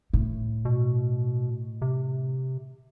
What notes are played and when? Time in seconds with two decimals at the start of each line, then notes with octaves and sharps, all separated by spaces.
0.13 A2
0.65 B2
1.82 C3